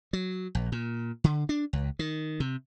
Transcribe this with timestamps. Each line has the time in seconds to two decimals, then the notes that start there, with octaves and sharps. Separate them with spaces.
0.13 F#3
0.55 A#1
0.72 A#2
1.24 D3
1.49 D4
1.73 C#2
1.99 D#3
2.40 C3